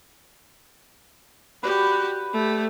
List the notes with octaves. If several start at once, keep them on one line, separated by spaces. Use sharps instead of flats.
F#4 G4 B4 D5
A3 G4